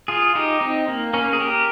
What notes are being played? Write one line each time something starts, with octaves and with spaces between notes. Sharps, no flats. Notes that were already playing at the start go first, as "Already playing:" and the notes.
F4 G#4
D#4 G4
C4 D#4
A#3
A#3 C#4
G#4
G4 A#4